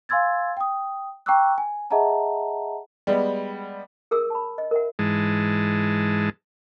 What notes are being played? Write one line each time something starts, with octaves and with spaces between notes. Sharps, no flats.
F5 G#5 C6 E6 G#6 A6
G5 D#6
G5 A#5 C#6 D6 E6 F#6
G#5
G#4 D#5 E5 F#5 A5 A#5
G3 G#3 B3
G#4 A#4 D#6 E6
A5 B5
D#5
A#4 E5 F#5
G#2 E3 G#3 A5